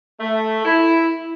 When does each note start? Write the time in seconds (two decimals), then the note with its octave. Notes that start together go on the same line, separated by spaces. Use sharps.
0.21 A3
0.65 E4